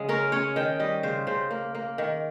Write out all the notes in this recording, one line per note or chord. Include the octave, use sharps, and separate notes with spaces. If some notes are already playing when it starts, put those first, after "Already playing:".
Already playing: C#3 G#3
C#4 A#4
C#4 C#5
D#3 G5
G3 D#5
C#3 C5
C#3 C5
A#3
A#3
D#3